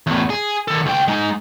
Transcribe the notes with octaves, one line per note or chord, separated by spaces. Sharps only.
E2 A2
G#4
D#3 A4
C#2 G5
G#3 D#4